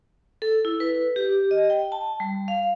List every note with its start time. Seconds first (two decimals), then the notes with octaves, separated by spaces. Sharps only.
0.42 A4
0.65 E4
0.80 B4
1.16 G4
1.51 D#5
1.70 G5
1.92 A5
2.20 G3
2.48 F5